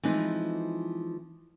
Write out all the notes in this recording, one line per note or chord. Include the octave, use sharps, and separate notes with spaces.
E3 F3 G#3 C4 D#4